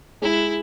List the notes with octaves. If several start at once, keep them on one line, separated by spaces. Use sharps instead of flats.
G#3 E4